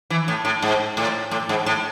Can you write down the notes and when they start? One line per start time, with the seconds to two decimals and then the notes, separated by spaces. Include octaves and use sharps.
0.10 E3
0.28 A2
0.45 A2
0.62 G#2
0.97 A2
1.31 A2
1.49 G#2
1.66 A2